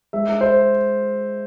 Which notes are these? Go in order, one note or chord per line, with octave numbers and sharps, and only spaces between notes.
G#3 E5
C5